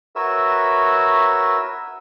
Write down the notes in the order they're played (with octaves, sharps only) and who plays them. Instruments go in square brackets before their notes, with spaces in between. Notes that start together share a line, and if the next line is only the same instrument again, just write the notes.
[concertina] F#4 A#4 B4 C#5 E5 E6